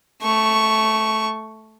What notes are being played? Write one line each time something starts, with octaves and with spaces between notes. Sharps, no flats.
A3 C#6